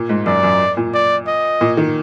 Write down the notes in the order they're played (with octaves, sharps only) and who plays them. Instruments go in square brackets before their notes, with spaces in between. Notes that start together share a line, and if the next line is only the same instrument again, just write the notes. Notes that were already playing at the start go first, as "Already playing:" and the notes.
Already playing: [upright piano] A#2
G#2
[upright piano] F#2 [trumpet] D5
[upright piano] F#2
A#2
[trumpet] D5
D#5
[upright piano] A#2
D#3